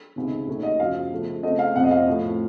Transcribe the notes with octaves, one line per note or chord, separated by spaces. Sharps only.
C#2 C3 D#3
D#2 D#3 A3 C#4
D#5
F#2 C#3 F3 F5
C#3 F3 A3
C#3 A3 C4 D#5
F5
F2 C3 F3 C4 F#5
D#5
F5
A2 F3 A3